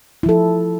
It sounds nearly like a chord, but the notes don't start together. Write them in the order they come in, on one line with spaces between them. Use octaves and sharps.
E4 F3 A4